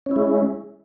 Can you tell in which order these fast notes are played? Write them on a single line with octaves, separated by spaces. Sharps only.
C#4 E4 G#3